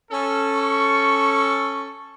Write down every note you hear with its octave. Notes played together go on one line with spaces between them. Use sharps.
C#4 A4
C#6